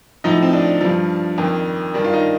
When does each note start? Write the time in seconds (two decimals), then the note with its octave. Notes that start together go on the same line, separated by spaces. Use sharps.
0.24 A2 F3 D#4
0.42 C4
0.53 D4
0.81 G2 F3
1.38 F2 D#3
1.94 G2 D#3 D4
2.04 F4
2.13 D#4